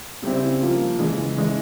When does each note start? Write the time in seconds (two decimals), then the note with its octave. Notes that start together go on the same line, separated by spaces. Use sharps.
0.22 C#3 G3 C4 E4
0.60 F3 A#3 F4
0.99 C#3 E3 G#3
1.37 E3 G#3 E4